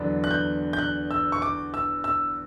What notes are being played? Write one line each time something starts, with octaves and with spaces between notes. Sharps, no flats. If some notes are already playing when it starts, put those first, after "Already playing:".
Already playing: E2 D3 F#3 B3 D4
F#6
G6
G6
F#6
E6
C#6
D6
E6
E6